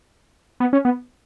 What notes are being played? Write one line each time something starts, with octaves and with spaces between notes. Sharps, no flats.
B3
C#4
B3